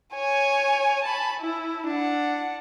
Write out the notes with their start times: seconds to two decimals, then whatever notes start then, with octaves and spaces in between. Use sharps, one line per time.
0.14 C#5 G#5
1.04 A5 B5
1.40 E4
1.87 D4 F#5